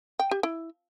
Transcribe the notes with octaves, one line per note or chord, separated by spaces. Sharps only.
G5
G4
E4